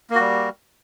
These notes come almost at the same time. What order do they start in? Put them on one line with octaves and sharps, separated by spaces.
A#3 F#4 G3